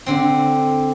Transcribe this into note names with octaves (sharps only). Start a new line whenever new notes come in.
D3 C4